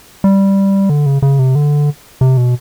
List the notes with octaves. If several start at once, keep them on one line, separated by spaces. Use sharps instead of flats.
G3
D3
C#3
C#3
C3
D3
C3
B2